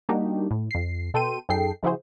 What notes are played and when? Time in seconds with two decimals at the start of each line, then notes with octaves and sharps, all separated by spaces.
0.09 G3 A#3 D4 D#4 F#4 G4
0.51 A2
0.71 F2 C7
1.14 B2 A4 G5 C6 D#7
1.49 F#2 D#4 G#4 A4 G5 C7
1.83 C#3 F3 E4 F#4 G#4 C5